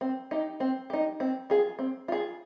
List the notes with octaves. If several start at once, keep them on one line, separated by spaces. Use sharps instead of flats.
C4
D#4 G4
C4
D#4 G4
C4
F4 G#4
C4
F4 G#4